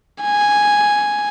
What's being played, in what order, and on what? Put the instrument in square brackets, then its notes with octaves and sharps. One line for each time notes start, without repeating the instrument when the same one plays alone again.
[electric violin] G#5